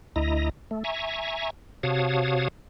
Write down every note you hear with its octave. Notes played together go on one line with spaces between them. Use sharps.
D2 E4 D#5 A#5
A3
E5 G#5 A#5 C#6
C3 F#4 C#5 F5 A5 D#6